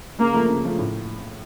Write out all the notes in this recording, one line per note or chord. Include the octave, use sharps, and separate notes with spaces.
C#3 A#3
F3 A3
C#3
F3 A3
A2